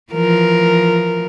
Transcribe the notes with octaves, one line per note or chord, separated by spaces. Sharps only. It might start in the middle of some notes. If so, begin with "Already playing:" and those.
E3 F3 A#4